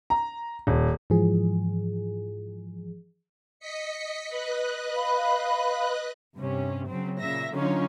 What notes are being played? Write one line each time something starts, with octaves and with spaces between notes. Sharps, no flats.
A#5
D#1
G#2 E3 F3 G#4
D#5 B6 C#7
B4 D#5 F#6
F5 B5
G2 C3 C#4
C#3 F#3 C4
A#2 C#3 E5 A#6
D3 F#3 C#4 D#4 F4 C#5